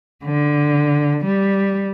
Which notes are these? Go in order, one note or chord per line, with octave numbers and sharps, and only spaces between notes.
D3
G3